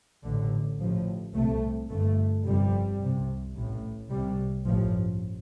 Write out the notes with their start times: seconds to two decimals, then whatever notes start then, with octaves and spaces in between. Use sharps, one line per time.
0.24 A1 A2 D3
0.80 A1 A2 F3
1.34 C2 C3 A3
1.89 G1 G2 A3
2.44 G1 F2 C3 G3
2.99 C2 C3
3.55 A1 A2
4.10 C2 C3 G3
4.65 A1 G2 F3